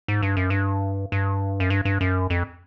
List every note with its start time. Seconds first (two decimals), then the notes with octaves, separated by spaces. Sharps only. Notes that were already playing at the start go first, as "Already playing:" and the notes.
0.08 G#2
0.22 G2
0.37 F#2
0.50 G2
1.12 G2
1.60 F#2
1.70 G2
1.85 G2
2.01 F#2
2.30 F2